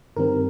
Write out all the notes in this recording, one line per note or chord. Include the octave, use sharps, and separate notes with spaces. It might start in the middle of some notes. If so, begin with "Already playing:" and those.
G2 D#3 G3 C4 A#4